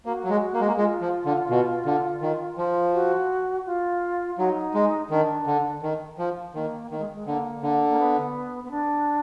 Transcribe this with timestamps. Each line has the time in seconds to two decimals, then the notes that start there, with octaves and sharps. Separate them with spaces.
0.05 A#3 F#4
0.24 F#3
0.29 G#3
0.53 A#3
0.61 G#3
0.68 A#3
0.77 G#3 F4
1.02 F3
1.26 D3
1.50 B2
1.86 D3
2.21 D#3
2.58 F3
2.93 F#4
3.66 F4
4.38 F#3 D#4
4.74 G#3
5.10 D#3 D4
5.47 D3
5.82 D#3
6.19 F3
6.55 D#3 A#3
6.91 D#3 A#3
6.98 G#3
7.13 G#3
7.27 D3 A#3
7.63 D3
7.89 A#3
7.99 B3
8.64 B3
8.71 D4